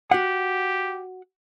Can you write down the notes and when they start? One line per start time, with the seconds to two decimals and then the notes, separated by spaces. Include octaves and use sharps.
0.11 F#4 G4 F#5